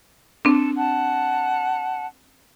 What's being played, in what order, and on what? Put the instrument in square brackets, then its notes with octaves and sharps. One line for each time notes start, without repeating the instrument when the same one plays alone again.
[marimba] C4 D4 [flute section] A4
[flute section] F#5 A5